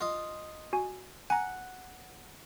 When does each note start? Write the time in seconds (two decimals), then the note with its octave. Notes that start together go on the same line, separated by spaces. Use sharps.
0.01 F4 D#5
0.73 F#4 G#5
1.30 F#5 G#5 A#5